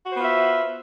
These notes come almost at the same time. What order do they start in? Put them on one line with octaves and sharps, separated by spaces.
F#4 C5 B3 F4 E5